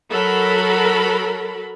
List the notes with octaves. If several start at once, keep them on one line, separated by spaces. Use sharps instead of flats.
F#3 A4 A#4 B5